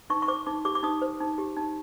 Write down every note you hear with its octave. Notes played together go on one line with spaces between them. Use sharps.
D#4 C#6
C#6
C5 D6
D#4 D6
G4 D6
D6
D#4 D#6
C5
D#4
G4
D#4